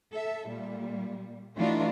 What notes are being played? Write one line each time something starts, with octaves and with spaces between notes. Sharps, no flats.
A4 E5
A#2 G3
E3 A3 D4 D#4 F4 F#4